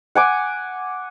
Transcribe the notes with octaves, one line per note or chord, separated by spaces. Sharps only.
F#5 G#5 D6